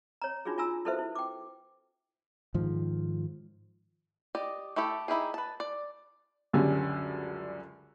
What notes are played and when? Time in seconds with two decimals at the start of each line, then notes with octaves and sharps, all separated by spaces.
0.22 C#5 A#5
0.45 D4 D#4 F4 F#4 G#4
0.58 F4 G#5 A#5 E6
0.85 E4 F#4 A4 B4 C5 E5
0.99 E4
1.15 G5 D6
2.54 G#2 D#3 F3
4.35 G4 D5 D#5
4.76 A3 E4 G4 A4
5.08 D#4 E4 G4 G#4
5.34 B4 A5
5.60 D5
6.53 C#2 F#2 D3 G3 C#4